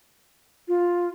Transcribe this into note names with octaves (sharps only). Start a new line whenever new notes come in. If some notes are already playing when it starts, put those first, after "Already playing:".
F4